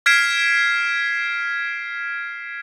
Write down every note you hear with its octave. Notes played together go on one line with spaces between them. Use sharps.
F6 G#6 B6 C7 D7 E7